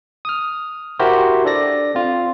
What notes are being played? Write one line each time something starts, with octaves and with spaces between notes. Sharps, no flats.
D#6 F6
E4 F#4 G4 A#4 C5
D4 A4 D5 A#6
C4 F4